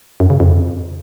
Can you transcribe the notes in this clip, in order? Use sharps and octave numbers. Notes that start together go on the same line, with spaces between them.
F#2
C#3
F2